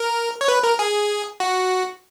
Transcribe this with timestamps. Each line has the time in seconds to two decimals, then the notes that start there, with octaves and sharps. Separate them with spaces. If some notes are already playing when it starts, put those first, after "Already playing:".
Already playing: A#4
0.41 C#5
0.48 B4
0.63 A#4
0.79 G#4
1.40 F#4